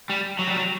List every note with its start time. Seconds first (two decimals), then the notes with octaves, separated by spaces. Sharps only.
0.10 G3
0.39 F#3
0.48 G3
0.57 F#3